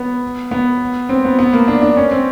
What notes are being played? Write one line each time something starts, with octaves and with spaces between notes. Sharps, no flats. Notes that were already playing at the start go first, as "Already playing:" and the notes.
Already playing: B3
B3
C4
B3
B3
A#3
D4
D4
C#4
C4